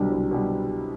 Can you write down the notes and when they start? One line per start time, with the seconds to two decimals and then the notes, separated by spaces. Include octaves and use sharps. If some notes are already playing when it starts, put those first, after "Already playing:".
Already playing: C2 B2 D3 F#3 G3
0.11 C2
0.31 B2 G3